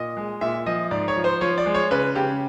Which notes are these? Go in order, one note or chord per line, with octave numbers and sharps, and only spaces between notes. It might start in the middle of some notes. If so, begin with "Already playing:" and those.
Already playing: A#2 D#5
G#3
A#2 E5
F3 D#5
G#2 D5
C#5
F3
C5
F3 C#5
D5
G#3
C#5
C#3 B4
C#3 G4